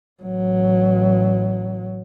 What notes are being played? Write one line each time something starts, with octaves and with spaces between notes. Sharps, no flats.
A1 F#3